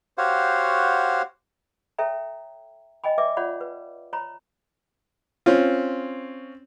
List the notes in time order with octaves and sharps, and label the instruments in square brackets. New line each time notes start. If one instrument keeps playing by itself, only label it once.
[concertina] F#4 G4 C5 C#5 F5 F#5
[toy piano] A4 C#5 E5 G5 A#5
D#5 G5 G#5 B5
B4 D5 E5 D6
F4 C#5 D5 F#5 B5
B4
C#5 A#5 B5
[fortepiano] C4 C#4 F4